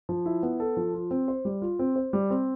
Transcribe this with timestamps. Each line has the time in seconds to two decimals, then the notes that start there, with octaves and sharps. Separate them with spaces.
0.09 F3
0.26 E4
0.43 B3
0.60 A4
0.77 F3
0.94 F4
1.11 C4
1.28 C5
1.45 G3
1.62 F4
1.79 C4
1.96 C5
2.13 G3
2.30 C4